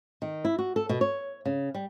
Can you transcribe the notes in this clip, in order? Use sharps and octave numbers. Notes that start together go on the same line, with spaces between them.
D#3
E4
F#4
A4
B2
C#5
C#3
G3